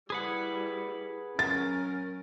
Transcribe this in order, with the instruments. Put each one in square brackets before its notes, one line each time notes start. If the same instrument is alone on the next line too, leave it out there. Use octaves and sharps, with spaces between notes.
[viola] G3 E4 [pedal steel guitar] G#4 B4 F#5
[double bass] F#3 C#4 [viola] A#4 [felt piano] A6